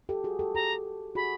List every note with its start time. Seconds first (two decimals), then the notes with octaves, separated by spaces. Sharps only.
0.09 G4 A4
0.24 F#4 G#4
0.39 G4 A4
0.55 G4 A4 A#5
1.15 F#4 G#4 B5